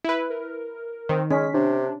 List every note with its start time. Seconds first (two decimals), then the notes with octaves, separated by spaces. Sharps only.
0.05 E4 B4
0.30 A#4
1.09 D#3 C4
1.31 G#3 C#4 B6
1.54 C3 D4